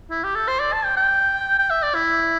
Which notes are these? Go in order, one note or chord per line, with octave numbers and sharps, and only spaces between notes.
E4
G4
A4
C5
D5
A5
G5
G5
G5
E5
D5
E4